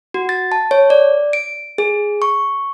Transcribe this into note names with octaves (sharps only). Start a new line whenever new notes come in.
F#4
A6
A5
C#5
D5
D7
G#4
C#6